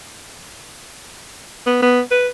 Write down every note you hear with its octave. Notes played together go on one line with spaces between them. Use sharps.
B3
B3
B4